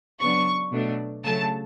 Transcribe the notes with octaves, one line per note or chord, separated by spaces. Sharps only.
C#3 F#3 B3 D4 C#6
B2 F#3 A3 D4
C#3 F#3 A3 A5